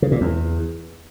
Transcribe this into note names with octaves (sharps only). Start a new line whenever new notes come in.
C#3
A#2
E2